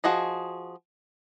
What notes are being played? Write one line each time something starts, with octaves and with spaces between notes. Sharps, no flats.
F3 F#4 G#4 D#5